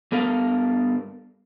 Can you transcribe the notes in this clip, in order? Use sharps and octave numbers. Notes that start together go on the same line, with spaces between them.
G2 B3 A4 A#4 F5